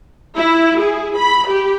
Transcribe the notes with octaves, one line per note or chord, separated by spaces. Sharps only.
E4
G#4
B5
G4